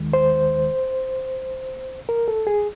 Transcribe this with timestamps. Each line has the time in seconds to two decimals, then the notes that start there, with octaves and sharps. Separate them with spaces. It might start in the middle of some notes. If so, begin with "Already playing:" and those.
Already playing: D#2 D#3 G#3
0.13 C5
2.09 A#4
2.28 A4
2.47 G#4